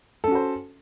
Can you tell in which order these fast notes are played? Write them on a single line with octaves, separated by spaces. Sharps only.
A4 C#4 F#4 C5